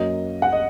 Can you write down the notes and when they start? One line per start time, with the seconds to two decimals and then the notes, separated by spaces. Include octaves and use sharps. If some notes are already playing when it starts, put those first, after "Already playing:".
Already playing: F#2 F#3 A#3 D#5
0.42 F#5
0.52 D#5